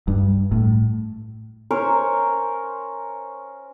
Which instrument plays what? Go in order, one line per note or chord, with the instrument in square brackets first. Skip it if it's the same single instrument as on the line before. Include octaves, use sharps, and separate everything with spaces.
[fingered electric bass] G2
A2
[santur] C#4 A#4 C5 C#5